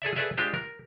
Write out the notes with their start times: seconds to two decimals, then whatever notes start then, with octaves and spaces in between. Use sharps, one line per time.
0.02 G#4 A4 D5 E5
0.16 G#4 A4 B4 D5 E5 F5
0.37 G#3 D4 F4 G4 C5
0.54 A#4